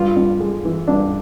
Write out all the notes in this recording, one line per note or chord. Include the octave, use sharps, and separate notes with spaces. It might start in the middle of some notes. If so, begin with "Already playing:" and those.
Already playing: G2 F4
G2
G#3
E3
G2 D4